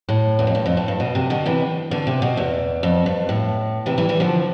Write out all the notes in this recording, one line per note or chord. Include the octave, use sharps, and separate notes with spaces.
A2
E2
F2
G2
F2
A2
G2
B2
C3
B2 D3
C3 E3
B2 D3
C3
B2
E2
F2
G2
A2
C3 E3
E3 G3
E3 G3
D3 F3